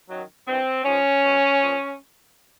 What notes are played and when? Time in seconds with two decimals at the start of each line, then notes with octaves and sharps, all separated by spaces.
0.08 F#2 D#3 F#3
0.46 G2 E3 C4
0.84 G#2 F3 C#4
1.23 B2 F#3
1.61 A#2 F3